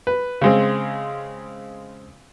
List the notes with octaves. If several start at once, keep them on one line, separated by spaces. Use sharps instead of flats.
B4
C#3 G#3 C4